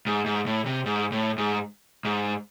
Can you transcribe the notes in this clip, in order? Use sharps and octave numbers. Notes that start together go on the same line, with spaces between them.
G#2
G#2
A2
C3
G#2
A2
G#2
G#2